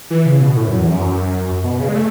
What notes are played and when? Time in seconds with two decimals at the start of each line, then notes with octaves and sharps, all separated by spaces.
0.11 E3
0.26 C#3
0.41 B2
0.56 A2
0.68 F#2
0.79 E2
0.91 F#2
1.64 B2
1.80 C#3
1.89 G#3
1.95 A3